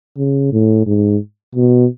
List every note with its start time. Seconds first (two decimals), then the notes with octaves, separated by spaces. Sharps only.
0.17 C#3
0.52 A2
0.87 G#2
1.55 B2